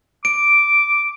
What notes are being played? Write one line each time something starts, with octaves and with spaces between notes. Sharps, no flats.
D6 D7